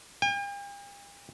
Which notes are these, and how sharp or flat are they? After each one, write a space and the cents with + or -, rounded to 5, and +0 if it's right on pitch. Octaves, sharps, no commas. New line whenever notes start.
G5 +45